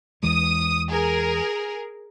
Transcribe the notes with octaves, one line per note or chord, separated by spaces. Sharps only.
E2 E3 G#3 D#6
G#4 A#4